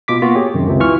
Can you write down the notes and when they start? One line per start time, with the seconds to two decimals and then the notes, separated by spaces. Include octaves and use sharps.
0.08 B2 F4 D6 B6
0.22 A#3 B3 F4 F#4
0.35 G4 G#4 C#5
0.54 F#2 C3 D#3
0.67 C#2 C3
0.80 E3 F4 C#6 F6